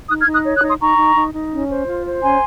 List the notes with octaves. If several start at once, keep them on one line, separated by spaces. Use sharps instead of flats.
D#4 D#6 F#6
F6 G#6
D#4
D#6 F#6
C#5
D#6 F#6
D#4
C6 D#6
D#4 A#5 C#6
D#4
D#4
D#4
C#4
C5
F4
C5
C#4 G#5 C6